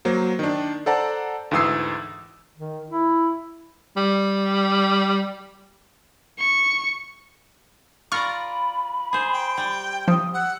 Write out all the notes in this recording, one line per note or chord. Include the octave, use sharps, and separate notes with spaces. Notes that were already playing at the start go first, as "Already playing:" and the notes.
F#3 A#3 C5
D#3 D4
A4 C5 D5 F#5 A5 A#5
D2 G#2 E3 D#6 E6 C7
D#3
E4
G3
C#6
F4 A#4 D5 B5 C#6 F6
G#4 C5
G5
G3
F3 D#6
F#5 E6